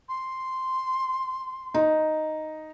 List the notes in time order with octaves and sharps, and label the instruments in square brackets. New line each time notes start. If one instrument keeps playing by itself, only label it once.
[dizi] C6
[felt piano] D#4